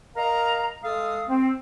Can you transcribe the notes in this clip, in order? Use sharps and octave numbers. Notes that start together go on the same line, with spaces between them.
A#4 D#5 F5 A#5
G#3 A4 F5 D#6
C4